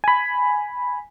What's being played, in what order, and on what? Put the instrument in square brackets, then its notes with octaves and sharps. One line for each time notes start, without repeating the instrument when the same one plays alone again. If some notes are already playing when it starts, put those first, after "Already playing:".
[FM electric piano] G#5 B5